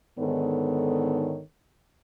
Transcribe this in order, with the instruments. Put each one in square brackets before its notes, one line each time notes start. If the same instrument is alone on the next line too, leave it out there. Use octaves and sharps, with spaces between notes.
[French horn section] G#2 D3 D#3 B3 A4 C#5